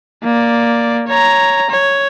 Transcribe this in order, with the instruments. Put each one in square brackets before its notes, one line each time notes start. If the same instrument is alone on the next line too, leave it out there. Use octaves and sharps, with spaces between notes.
[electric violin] A#3 D5
C#5 A#5
C#5